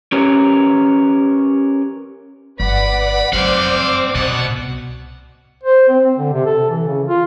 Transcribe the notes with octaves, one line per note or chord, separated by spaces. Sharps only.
C#4 G4 A#4 B4 C#5
G1 B4 D5 F#5 B5
F#3 G3 C4 C5 D5 F5 F#5 D6
C2 B2 F#5
C5
C4
D3
C3
A4
E3
C#3
F4